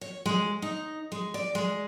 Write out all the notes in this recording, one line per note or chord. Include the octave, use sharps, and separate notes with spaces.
C#5
G#3
D#4
G#3
D5
G#3